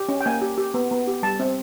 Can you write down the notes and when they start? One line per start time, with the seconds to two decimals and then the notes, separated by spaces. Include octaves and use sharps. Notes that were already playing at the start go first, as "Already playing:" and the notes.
Already playing: G4
0.09 C#4
0.21 G5
0.26 A#3 G#5
0.42 G4
0.58 G4
0.74 B3
0.91 B3
1.07 G4
1.23 G3 A5
1.40 C4